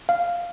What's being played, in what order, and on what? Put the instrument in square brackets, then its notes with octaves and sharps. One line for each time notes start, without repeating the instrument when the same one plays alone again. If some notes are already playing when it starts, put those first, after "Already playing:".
[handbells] F5